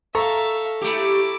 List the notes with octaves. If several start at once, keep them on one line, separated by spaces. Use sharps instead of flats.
A4 E5 F5 A#5 C#6
A3 E4 G4 D6